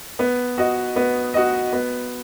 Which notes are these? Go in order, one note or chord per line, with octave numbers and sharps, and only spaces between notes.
B3
F#4 D#5
B3
F#4 D#5
B3